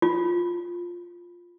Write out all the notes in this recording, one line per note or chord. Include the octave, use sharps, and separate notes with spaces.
F4